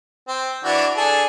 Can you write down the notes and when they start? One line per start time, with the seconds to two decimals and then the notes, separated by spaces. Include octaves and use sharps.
0.28 C4
0.64 E3 D4 F#4
0.96 D4 G#4 A4